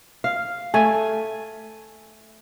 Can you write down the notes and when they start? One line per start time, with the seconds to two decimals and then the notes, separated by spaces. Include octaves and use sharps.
0.24 F5
0.74 A3 G#5